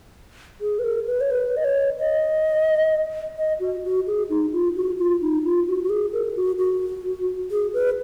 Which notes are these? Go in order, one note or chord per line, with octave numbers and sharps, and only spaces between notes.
G#4
B4
A#4
B4
C#5
B4
D#5
C#5
D#5
D#5
F#4
F#4
G#4
D#4
F4
F#4
F4
D#4
F4
F#4
F#4
G#4
A#4
F#4
F#4
G#4
B4